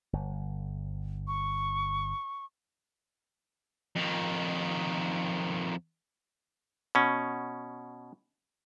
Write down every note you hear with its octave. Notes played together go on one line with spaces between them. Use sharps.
G1
C#6
F2 D#3
B2 C#4